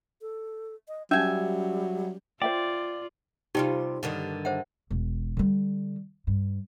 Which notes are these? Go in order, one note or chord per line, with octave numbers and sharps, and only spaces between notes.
A4
D#5
F#3 G3 C#4 E5 G#5
F4 C5 D5 E5 G5
C3 G3 D#4 F4 G4 G5
G2 D3 D#3
C5 E5 F#5
E1
D3 G3
G2